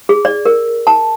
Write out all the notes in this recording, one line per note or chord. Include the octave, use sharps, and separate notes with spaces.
G#4
D5
A#4
A5